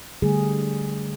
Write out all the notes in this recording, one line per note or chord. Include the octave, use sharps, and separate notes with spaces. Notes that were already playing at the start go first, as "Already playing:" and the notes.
D3 G3 A3 G#4